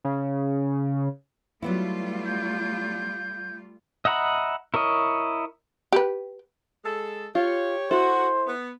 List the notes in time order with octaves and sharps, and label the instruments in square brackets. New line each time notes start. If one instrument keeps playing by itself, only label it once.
[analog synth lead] C#3
[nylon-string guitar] F#3 B3 E4 [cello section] G3 A3 F4
[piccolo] G6
[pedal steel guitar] D#5 E5 F#5 A#5 B5
E4 A#4 C#5 D#5
[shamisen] G4 B4
[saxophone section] G#3 A4
[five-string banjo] F4 [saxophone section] G4 C#5
[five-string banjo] E4 A4 [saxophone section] F#4 [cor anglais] C5
[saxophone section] B3